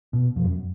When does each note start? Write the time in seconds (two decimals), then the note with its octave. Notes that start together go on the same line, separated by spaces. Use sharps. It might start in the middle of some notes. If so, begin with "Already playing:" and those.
0.13 B2
0.36 F2
0.44 F#2